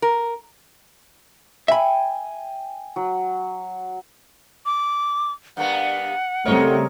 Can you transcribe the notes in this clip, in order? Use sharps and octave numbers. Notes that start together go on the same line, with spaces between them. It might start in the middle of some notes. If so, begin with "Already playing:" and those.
A#4
E5 G5 G#5 B5
F#3
D6
G2 A#3 B3 F#5
C#3 G3 A3 C4 A#4 C#5 D#5